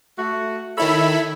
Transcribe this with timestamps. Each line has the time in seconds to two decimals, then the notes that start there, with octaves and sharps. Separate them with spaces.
0.18 A3 F#4
0.78 D#3 E4 A4 C#5 E5 B5